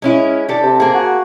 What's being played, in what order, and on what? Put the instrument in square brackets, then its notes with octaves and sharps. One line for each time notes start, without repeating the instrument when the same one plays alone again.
[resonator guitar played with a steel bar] G#3 C#4 E4
[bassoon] D4 [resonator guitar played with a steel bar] G4 A4
[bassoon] C3
[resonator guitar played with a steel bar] A#3 G#4
[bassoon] F#4